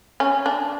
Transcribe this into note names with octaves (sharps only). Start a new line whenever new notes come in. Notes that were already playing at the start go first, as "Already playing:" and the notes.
C#4
D4